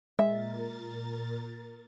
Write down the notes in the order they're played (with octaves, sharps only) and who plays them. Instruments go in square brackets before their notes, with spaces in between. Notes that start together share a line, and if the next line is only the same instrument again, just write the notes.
[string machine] A#2 A#4 A6 [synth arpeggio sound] G#3 [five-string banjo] E5